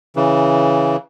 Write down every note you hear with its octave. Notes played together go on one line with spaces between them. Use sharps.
C#3 E3